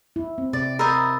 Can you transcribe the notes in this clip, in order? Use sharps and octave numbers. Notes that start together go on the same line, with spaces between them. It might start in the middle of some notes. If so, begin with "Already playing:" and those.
E4
C4
C3 D5
A#4 C5 D#5 B5 E6 A6